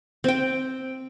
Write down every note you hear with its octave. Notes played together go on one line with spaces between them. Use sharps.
C4 G5